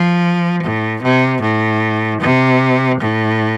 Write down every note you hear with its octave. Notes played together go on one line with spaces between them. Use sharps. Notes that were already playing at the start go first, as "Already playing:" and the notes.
Already playing: F3
A2
C3
A2
C3
A2